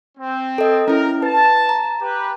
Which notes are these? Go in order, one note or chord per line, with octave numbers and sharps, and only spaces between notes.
C4
A4 D#5
C#4 E4 A#4
B4 A5
A#5
G4 B4